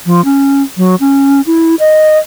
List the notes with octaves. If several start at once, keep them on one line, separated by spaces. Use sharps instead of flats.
F3
C#4
F#3
C#4
E4
D#5